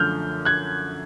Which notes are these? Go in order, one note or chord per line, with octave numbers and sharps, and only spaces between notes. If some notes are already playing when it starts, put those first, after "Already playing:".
Already playing: F#2 D3 F3 A3 F6 G6
F#6 G#6